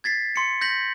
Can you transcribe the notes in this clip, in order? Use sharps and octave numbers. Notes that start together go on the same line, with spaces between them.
G#6 A6 B6 C7
C6 C#7
G6 A#6 B6 F#7